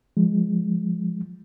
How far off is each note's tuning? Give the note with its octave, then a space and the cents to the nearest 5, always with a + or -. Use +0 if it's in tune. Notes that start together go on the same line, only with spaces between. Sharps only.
F3 +0 G#3 +0